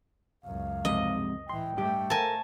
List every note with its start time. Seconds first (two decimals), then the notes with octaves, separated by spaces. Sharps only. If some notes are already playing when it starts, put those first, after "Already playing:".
0.45 C#2 F#2 F5
0.85 F2 G#2 C3 D#5
1.49 A2 E3 G5 C6
1.78 G2 A3 G4
2.10 A4 A#4 G#5 A5